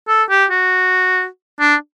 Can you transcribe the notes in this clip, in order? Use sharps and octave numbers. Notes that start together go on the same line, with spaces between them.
A4
G4
F#4
D4